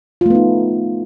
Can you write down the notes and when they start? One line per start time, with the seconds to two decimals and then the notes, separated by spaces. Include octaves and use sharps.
0.21 F4
0.26 A3
0.30 B3
0.35 D#4